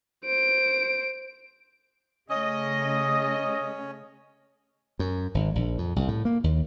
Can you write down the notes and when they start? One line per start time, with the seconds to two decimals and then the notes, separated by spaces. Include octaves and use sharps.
0.25 C5 D7
2.30 C#3 A3 C#4 D#5
4.99 F#2
5.34 G#1
5.55 A#1
5.78 F2
5.96 C2
6.08 A2
6.25 A#3
6.44 D#2